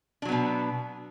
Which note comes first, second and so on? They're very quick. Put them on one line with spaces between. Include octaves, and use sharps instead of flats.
D4 F#3 B3 B2